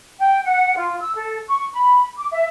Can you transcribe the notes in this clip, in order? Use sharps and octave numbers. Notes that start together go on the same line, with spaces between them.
G5
F#5
F4
E6
A4
C#6
B5
D6
E5